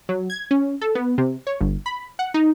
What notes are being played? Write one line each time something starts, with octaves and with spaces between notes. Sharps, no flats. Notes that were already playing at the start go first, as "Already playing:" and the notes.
F#3
G#6
C#4
A4
B3
C3
C#5
G1
B5
F#5
D#4